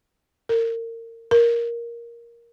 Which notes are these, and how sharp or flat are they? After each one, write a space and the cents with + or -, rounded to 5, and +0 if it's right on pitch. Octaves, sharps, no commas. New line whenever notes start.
A#4 -30
A#4 +10